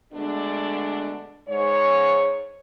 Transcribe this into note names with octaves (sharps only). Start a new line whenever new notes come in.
B2 D3 G#3 A3 D4
G#2 C#5